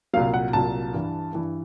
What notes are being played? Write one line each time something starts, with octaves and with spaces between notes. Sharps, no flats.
C2 A#2 F#3 F5
F#5
C2 A#2 F#3 A5
G2 E3
G2 E3